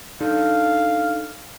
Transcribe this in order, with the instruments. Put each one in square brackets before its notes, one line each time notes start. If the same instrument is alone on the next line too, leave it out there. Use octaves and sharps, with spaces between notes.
[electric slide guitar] D4 D#4 A4 [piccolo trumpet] F5